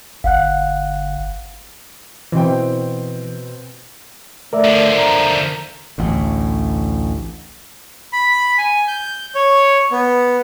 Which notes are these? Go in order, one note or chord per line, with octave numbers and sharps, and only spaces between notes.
G1 F5 F#5 F#6
B2 E3 C4 G5
A3 A#4 D5 E5
D3 F3
A#5
A1 D2 A2
B5
G#5
G6
C#5
B3